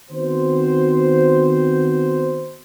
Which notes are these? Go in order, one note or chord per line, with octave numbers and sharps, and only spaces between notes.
D#3 B3 C4 F#4 C5